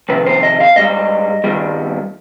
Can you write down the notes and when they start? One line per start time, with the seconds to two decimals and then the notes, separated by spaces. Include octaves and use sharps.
0.09 F2 C3 D#3 B4
0.26 C5
0.43 D#5
0.60 F5
0.76 G#2 G3 D#5
1.44 G2 D#3 G3